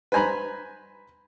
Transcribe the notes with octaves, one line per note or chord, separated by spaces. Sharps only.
B4 C5 G#5 A#5 B5